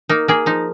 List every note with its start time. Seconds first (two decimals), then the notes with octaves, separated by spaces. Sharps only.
0.09 A#3 D#4
0.28 A#3 G#4
0.46 F3 D#4